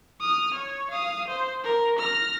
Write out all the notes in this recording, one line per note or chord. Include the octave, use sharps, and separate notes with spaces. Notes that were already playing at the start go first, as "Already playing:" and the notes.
D#6 F6
C#5
F5 D#6
C5
A#4
F6 A#6